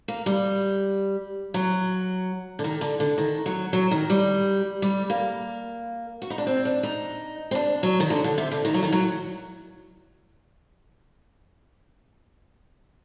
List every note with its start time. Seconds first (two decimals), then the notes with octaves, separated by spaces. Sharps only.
0.08 A#3
0.26 G3
1.54 F#3
2.59 D3
2.64 D#3
2.81 D3
3.00 D3
3.18 D#3
3.46 F#3
3.73 F#3
3.91 D#3
4.10 G3
4.82 G3
5.10 A#3
6.22 F#4
6.30 D#4
6.38 D4
6.47 C4
6.65 D4
6.83 D#4
7.51 C4
7.55 D4
7.83 F#3
8.00 D#3
8.10 D3
8.24 D3
8.38 C3
8.51 D3
8.65 D#3
8.74 F#3
8.83 D#3
8.93 F#3